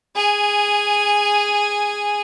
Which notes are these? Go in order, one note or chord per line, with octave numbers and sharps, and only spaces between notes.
G#4 G#5